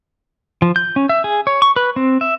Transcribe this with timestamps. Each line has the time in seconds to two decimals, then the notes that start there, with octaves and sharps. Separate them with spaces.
0.62 F3
0.76 G6
0.96 C#4
1.09 E5
1.24 G#4
1.47 C#5
1.62 C#6
1.76 B4
1.96 C4
2.21 E5